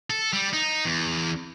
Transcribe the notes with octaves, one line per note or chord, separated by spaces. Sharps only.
A4
G3
D#4
E2